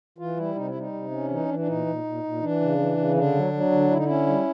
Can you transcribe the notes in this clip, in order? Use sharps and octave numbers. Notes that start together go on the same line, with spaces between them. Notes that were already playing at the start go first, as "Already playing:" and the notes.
E3 F4
G3 E4
C3 D#4
E4
G3 D#4
C3
C#4
D4
E3 D#4
E3 D4
D4
A#2 D#4
A#2
A#2
A#2
E3 D4
C#3
E3
C#3
D3 D4
F#3
F#3
D3
D3 E4
D#4
C#4 E4
G3